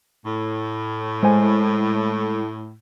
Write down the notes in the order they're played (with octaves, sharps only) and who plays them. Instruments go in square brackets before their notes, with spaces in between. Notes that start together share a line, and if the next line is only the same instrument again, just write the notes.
[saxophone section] A2
[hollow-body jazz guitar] G#3 C5 G#5